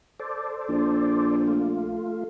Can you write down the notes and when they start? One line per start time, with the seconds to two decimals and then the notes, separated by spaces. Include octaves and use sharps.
0.20 A4 C5 D5
0.69 A#1
1.48 A3 F4